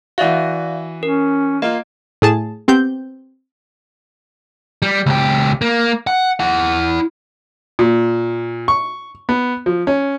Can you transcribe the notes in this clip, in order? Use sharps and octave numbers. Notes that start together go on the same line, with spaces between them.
E3 F#4 D5 E5 F5
C#4 A#4
A#3 F4 D#5
A2 G#4 A5
B3 C4 G4 G6
G3
C#2 G4
A#3
F#5
E4 F#5
A#2
C#6
B3
F3
C#4